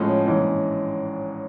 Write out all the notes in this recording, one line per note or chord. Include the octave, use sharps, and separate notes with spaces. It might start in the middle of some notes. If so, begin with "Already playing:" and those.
Already playing: A2 F3 G#3 C#4
A#1 G#2 E3 G#3 C#4